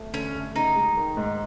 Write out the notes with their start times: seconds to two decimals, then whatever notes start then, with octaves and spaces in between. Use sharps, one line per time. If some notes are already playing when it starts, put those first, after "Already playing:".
Already playing: A3
0.13 D3 C#4
0.35 A3
0.55 C#3 D#4
0.75 G#3
0.97 D#3
1.17 G#2